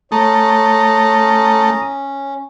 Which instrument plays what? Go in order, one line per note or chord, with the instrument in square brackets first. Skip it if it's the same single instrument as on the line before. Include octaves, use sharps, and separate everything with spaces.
[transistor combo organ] A3 [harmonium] C#4 [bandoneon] A#5 D#6